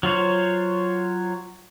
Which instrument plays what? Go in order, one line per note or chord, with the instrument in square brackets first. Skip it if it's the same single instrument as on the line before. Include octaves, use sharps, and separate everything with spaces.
[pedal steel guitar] F#3 F4 C5 C#5